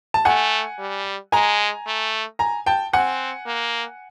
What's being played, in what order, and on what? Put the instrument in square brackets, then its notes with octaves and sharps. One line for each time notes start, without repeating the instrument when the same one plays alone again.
[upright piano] A5
[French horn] A3 [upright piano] F#5 G#5
[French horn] G3
[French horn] G#3 [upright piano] G#5 A#5
[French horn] A3
[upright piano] G#5 A#5
G5 A5
[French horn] C4 [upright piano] F#5 G#5
[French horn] A#3